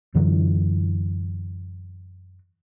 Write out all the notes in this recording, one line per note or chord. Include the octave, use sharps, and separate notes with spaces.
F#2 D3 E3 F#3